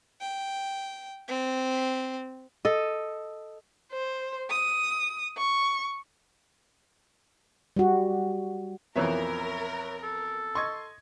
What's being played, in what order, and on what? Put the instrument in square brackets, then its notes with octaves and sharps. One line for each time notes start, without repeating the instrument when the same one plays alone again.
[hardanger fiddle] G5
C4
[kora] A4 D#5
[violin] C5
D#6
C#6
[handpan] G3 F#4
[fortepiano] B1 F2 E3 [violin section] A#4 [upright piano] B4 C#5 E5
[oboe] A4
[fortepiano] D#5 C#6 [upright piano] C6 G#6